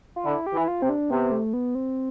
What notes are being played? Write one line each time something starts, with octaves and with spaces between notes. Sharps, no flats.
F4
D3 E4
G4
E3
E4
F4
C3 C4
D4
C3 B3
A3
B3
C4